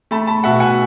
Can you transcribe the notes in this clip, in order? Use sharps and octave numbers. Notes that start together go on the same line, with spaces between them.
A3 A5 B5
A5 B5
B2 E5 F#5
F#5 G#5